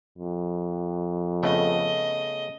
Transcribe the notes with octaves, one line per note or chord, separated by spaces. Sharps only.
F2
C#3 A3 B3 D#5